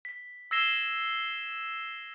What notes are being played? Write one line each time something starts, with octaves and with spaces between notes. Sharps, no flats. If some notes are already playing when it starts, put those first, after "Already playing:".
B6
E6 G#6 A#6 C7 E7 G7